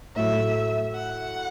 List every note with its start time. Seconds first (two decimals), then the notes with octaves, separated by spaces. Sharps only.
0.15 A2 F#3 A3 E5
0.95 F#5